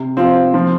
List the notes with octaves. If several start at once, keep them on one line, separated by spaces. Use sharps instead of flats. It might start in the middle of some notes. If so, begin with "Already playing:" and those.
Already playing: C3
F3 C4
F3